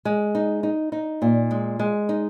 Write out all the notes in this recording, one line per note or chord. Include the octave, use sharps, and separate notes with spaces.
G#3
D#4
D#4
D#4
A#2
G#3
G#3
D#4